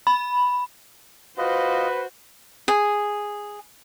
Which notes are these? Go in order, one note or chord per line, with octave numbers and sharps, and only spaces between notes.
B5
F4 F#4 B4 C5 D#5
G#4